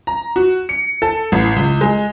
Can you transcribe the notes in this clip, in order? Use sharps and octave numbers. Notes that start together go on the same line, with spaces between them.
A#5
F#4
C#7
A4
A1
C#2
G#3